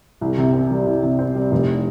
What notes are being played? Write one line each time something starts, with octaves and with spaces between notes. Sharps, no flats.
C2
C3
C4
G3
C2
C3
C4
G3
F1